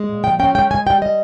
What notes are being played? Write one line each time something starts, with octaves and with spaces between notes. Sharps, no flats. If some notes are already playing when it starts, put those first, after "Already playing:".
Already playing: G#3
A#2
F3 G5
C#4 G5
G#3 G5
G#3 G#5
G3 G5
G3 D#5